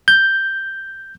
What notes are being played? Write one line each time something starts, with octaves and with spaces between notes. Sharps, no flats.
G6